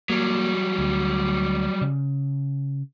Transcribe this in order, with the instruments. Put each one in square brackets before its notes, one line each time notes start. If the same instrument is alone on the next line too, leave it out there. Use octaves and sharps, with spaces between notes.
[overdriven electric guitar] F#3 G3 [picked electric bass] A#3
[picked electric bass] D2
C#3